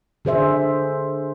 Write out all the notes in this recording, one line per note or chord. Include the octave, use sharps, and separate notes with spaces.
D3 G#4 C5 E5